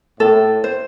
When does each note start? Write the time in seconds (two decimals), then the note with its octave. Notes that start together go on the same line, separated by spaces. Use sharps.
0.20 A2 A4
0.64 C5